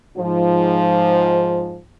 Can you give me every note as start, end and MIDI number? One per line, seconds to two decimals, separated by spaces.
0.18 1.80 44
0.18 1.80 53